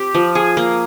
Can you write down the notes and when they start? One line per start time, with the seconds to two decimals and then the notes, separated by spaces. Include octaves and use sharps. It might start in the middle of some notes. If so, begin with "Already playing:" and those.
Already playing: C4 G4
0.15 F3
0.35 G#4
0.57 A#3